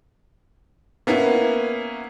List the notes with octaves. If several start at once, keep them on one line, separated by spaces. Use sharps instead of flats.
A#3 B3 C#4 E4